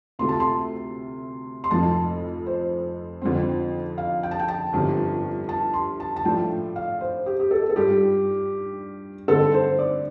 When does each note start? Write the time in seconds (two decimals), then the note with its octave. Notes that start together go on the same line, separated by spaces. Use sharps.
0.19 D2 C3 A3 F4 C6
0.29 A5
0.40 C6
1.64 C6
1.70 F1 F2 F3 A5
2.46 C5
3.22 F2 D3 F3 C4
3.98 F5
4.23 G5
4.31 A5
4.39 G5
4.48 A5
4.73 G1 G2 F3 C4 G4
5.49 A5
5.74 C6
6.00 A5
6.16 A5
6.24 A2 F3 A3 D4 F4 G5
6.76 F5
7.01 C5
7.26 G4
7.40 G4
7.51 A4
7.69 A4
7.76 G2 G3 F4 G4
9.28 G2 D3 A3 C4 A4
9.53 C5
9.79 D5